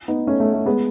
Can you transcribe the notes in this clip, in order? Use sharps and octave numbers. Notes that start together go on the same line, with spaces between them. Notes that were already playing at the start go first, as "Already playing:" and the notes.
B3 D#4
A3 C#4
A3
A3
G#3 B3